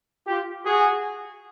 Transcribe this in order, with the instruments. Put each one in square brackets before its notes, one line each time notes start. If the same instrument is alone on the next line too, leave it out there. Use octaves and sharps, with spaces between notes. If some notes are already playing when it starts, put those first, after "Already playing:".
[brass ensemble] F4 G4
F#4 G#4